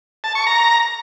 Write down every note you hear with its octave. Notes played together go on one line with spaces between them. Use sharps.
A5
C#6
A#5